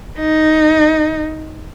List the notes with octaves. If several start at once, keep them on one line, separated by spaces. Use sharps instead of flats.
D#4